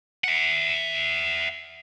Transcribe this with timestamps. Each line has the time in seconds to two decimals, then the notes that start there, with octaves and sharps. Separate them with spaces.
0.24 E5 F#5